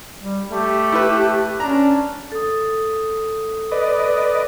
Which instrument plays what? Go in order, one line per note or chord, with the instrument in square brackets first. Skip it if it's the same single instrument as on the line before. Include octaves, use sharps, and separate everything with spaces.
[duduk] G3
[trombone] A3 [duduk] G4
[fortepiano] E4 B4
[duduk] C#4 [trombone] D4 [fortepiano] A#5
[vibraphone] A4 D#6
[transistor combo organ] B4 D5 D#5